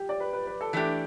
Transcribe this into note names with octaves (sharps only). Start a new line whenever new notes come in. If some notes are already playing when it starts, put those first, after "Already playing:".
Already playing: G4
D5
B4
B4
B4
A4
E3 A3 D4 G4 A4